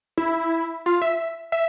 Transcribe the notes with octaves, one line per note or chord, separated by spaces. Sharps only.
E4
F4
E5
E5